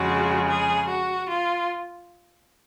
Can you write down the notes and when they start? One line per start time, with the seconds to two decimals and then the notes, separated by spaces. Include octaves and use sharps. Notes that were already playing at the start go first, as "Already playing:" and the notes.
Already playing: F2 C#3 G#3 F#4
0.48 G#4
0.89 F#4
1.29 F4